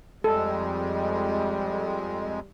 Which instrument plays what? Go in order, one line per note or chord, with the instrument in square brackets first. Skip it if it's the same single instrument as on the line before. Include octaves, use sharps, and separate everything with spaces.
[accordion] F2 G#3 [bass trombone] G3 [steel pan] A4